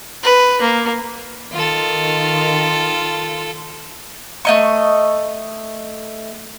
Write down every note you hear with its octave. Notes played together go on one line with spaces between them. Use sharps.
B4
A#3
D#3 F4 A4
A3 D#5 C#6